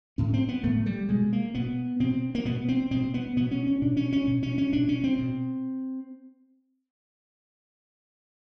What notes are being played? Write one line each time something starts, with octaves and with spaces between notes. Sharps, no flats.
A2 C#4
C4
B3
A2 A3
G3
B2 G#3
A#3
B2 B3
B2 C4
A#3
B2 B3
C4
B2 C4
B3
B2 B3
C#4
C#4
B2 D4
C#4
C#4
B2
C#4
C#4
B2 D4
C#4
C4
B2